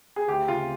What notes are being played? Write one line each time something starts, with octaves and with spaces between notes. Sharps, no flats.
G#4
D2 G4
C#3 F4